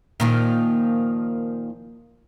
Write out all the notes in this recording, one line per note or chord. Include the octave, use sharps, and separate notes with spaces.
A#2 D#3 F3